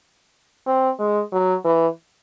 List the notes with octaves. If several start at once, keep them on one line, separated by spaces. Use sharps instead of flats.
C4
G#3
F#3
E3